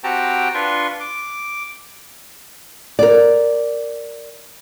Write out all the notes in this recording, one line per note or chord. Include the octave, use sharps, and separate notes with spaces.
C4 F#4 G4 G5 A5 A#5
D4 F4 B4 C6 C#6
D6
A#4 D5